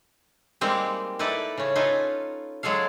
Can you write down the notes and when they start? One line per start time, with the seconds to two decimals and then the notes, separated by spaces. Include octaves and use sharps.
0.61 G3 G#3 A#3 C4 D#4
1.19 D#4 E4 A4 B4 D5
1.58 C#3 C#4
1.76 D#4 F4 A4 B4 G#5
2.63 F#3 G#3 G#4 A4 F5